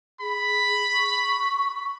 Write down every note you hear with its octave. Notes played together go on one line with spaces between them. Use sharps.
G#4 B5
C#6